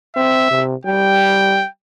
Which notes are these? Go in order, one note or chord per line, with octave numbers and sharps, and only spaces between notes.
C4 E5
C3
G3 G5